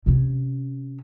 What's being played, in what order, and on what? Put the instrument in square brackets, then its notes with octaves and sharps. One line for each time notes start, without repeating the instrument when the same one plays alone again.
[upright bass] C3 C#4